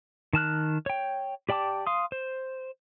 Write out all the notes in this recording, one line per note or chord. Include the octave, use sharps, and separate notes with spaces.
D#3 A5 F6 F#6
C#5 G5
G4 D5 G5 A5 D6
F5 C6 D#6
C5